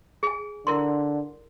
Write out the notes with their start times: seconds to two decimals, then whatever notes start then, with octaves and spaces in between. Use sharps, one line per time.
0.23 G#4 G#5
0.67 D3 E4 A#4 C6